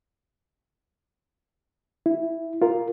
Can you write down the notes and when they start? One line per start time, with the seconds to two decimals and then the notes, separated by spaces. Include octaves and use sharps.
2.06 E4
2.62 F4 A#4